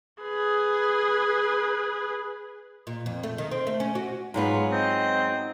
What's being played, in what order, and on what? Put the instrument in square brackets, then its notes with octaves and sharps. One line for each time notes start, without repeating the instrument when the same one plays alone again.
[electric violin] G#4 B4
[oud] A#2
F2
A3
D#3
C4
A3
C#4
F#4
[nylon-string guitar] G#2 F#3 B3 [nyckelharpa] F4
[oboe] C4 [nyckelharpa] D#5